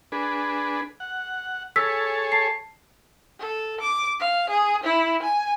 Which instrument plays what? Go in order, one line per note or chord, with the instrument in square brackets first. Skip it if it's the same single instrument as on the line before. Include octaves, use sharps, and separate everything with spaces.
[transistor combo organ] D4 G#4 B4
F#5
[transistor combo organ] G#4 A4 C#5 [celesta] E6 B6
[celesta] A5 C7
[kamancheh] A4
D6
F5
G#4
E4
G#5